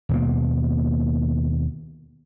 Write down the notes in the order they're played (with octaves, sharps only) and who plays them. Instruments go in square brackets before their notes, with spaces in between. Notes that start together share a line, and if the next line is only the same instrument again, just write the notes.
[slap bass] D#2 B2 A#3